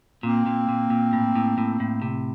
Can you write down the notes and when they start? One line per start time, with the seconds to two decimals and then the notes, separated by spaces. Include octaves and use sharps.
0.23 A#2 A#3 C4
0.46 A#2
0.69 A#2
0.90 A#2
1.13 A2
1.36 A2
1.58 A2
1.80 A2
2.02 C3